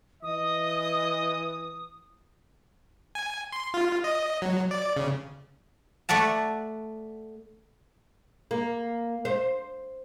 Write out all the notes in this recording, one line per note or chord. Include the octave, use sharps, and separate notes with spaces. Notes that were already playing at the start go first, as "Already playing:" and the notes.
E3 D#5 D#6
G#5
C6
F4
D#5
F#3
D5
C#3
A3 D5 F#5 A5
A#3
C5